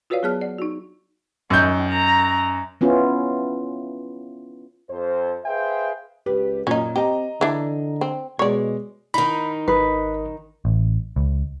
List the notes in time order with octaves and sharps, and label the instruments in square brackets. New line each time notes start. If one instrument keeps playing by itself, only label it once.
[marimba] F4 F#4 B4 C#5 D5 F5
F#3 B3 G#4 C#5 A5 F6
D5 F#5
D#4 F#4
[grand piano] F#2 G6 [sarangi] D#3
[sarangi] A#5
[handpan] B3 C#4 E4 F4
[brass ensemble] F2 C5
G#4 B4 C5 E5 F5 G5
[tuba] C#2 [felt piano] G4 B4
[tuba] F#2 [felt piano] A#2 [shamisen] C#4 D#4
[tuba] C4 [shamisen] G4 [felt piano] D#5 A#5
[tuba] D3 [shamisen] E3 D4
[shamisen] C4
[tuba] B2 [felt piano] G#3 [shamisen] C#5 D5
[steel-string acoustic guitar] D#3 D#4 [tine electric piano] B5
[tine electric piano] G#1 A#4 D#6 [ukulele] B4
[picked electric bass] A1
C#2